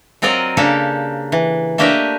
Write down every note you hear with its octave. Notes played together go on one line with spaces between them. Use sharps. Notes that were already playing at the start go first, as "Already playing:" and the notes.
F#3 C4 F4 A#4 D5 D#5
C#3 A#3 D4 G4 A4
E3
A3 A#3 D4 G4 D#5 E5